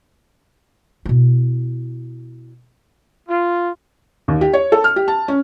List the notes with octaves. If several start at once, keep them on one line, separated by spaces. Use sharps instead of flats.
B2 E4
F4
D#2
G4
C#5
A4
F6
G4
A5
C#4